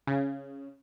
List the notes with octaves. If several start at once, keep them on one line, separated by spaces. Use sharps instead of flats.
C#3